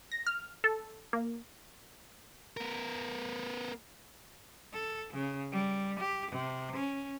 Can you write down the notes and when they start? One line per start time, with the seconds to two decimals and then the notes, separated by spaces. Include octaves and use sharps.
0.12 A#6
0.27 F6
0.64 A4
1.13 A#3
2.57 B3 A#4
4.73 A4
5.13 C#3
5.52 G3
5.99 G4
6.31 C3
6.76 C#4